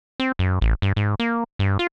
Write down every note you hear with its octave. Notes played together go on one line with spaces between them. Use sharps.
C4
F#2
A1
G2
G#2
A#3
G2
F4